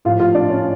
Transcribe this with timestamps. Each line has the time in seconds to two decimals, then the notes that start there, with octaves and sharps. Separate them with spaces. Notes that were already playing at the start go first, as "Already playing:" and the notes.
0.05 A2 F3 F4 F5
0.19 F4 F5
0.34 D4 D5
0.49 C#4 C#5